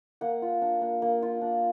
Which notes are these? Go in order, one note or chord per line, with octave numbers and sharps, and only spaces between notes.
A#3 F#5
F4
D4
A#3
A#3
F4
D4